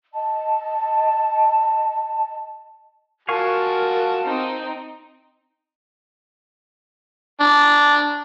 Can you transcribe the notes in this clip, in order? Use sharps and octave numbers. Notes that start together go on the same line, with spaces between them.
D#5 A5
F4 F#4 A#4 F5 G#5 A5 C#6
C4 D#4
D4